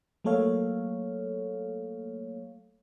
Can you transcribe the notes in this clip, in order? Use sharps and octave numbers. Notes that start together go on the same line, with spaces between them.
F#3 A3 A#3 A4 C#5 F5